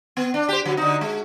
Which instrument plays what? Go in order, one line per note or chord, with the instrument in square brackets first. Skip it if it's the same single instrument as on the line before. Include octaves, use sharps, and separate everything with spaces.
[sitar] B3
D4
G4 C5
D3 F#3
D3 D#4
G#3